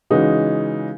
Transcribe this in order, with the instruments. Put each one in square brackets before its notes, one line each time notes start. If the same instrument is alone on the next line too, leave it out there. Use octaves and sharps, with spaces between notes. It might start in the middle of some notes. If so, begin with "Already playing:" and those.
[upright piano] C#3 E3 G#3 D#4 F#4